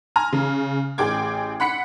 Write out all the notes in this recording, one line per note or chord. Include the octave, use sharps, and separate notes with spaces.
G#5 A#5 F6
C#3
A1 G#4 G5 D6 G#6
F#5 B5 B6 C#7